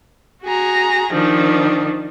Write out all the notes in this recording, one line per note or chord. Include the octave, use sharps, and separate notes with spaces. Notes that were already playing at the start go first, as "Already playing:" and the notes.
F#4 G#4 A#5
D#3 F3 D4 D#4